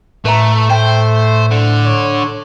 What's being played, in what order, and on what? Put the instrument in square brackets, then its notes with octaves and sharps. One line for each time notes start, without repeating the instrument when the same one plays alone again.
[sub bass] A2 [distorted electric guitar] A3 [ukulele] B4 E5 A#5
[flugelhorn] A3 [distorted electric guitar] C5 [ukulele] E5 G5
[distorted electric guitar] D3
[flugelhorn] C#5